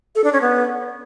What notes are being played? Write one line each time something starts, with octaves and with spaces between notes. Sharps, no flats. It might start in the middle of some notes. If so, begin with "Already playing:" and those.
A4
D4
C#4
B3